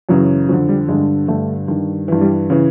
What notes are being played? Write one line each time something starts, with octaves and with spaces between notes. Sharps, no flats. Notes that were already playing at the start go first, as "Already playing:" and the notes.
F#2 C#3 E3 F#3
F2 D3 F#3
G3
G2 D3 G#3
G2 D3 A3
G2 D#3
G2 E3
G3
C#3 E3